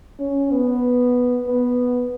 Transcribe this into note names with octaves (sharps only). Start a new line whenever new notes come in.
C#4
B3
B3